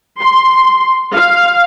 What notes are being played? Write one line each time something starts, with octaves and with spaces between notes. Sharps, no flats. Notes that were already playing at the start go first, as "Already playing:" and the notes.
C6
F5